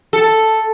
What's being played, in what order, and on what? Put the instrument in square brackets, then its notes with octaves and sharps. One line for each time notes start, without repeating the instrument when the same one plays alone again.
[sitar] A4